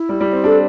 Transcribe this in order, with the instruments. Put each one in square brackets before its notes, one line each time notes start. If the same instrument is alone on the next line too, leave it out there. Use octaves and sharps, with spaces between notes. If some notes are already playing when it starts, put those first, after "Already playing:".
Already playing: [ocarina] E4
[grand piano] G3
G3
C4
[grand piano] D4 [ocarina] A4